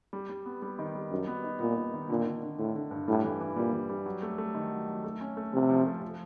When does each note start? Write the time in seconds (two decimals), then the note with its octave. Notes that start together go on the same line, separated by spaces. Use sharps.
0.13 G3
0.29 G3
0.46 B3
0.62 G3
0.79 D#3
0.95 G3
1.11 F#2 D#4
1.27 B3
1.44 D#4
1.60 A#2 B3
1.77 D#4
1.94 D#3
2.09 A#2 D3
2.26 D3
2.43 D3
2.58 A2 D3
2.75 D3
2.91 G2
3.08 A2 G3
3.24 E3
3.41 E3
3.56 A#2 G3
3.73 E3
3.89 G3
4.06 F#3
4.22 A3
4.38 A3
4.55 D#3
4.71 F#3
4.88 F#3
5.04 A3
5.21 C#4
5.37 A3
5.53 C3 F3
5.70 F3
5.86 A3
6.02 F3